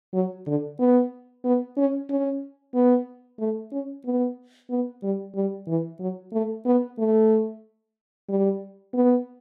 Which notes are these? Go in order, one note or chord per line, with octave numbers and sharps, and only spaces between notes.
F#3
D3
B3
B3
C#4
C#4
B3
A3
C#4
B3
B3
G3
G3
E3
F#3
A3
B3
A3
G3
B3